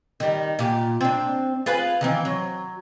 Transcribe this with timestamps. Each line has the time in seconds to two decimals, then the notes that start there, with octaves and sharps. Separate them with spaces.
0.20 D#3 G3
0.59 A#2 G4
1.01 C4 D4
1.66 F4 G#4 B4
2.01 D#3 E3 C4
2.25 F#3